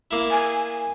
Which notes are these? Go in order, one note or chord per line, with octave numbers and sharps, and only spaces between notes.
A#3 E4
G#5